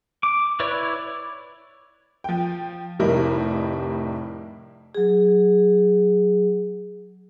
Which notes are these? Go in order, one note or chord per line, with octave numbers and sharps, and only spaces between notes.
D6
E4 B4 C#5 D5
F3 G5
F1 A2 G3 E4 A#4 D#5
F#3 G#4